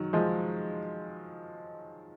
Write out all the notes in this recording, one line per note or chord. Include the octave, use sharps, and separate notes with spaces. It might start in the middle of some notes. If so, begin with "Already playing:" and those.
Already playing: D#3 F#3
F3 G#3